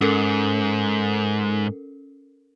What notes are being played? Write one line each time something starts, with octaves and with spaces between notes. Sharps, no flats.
G#2 C#4 A4 A#4